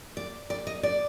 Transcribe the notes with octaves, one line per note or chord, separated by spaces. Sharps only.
D5
D5
D#5
D5